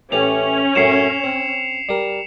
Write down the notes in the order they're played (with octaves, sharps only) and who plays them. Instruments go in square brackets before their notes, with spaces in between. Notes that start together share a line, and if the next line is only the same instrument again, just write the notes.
[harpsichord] A2 E3 G4 [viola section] C#4 [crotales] F7
[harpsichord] F#2 A2 F#3 [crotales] C7 C#7 E7
[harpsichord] C4
G3 A#4